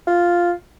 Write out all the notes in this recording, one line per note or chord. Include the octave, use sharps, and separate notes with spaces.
F4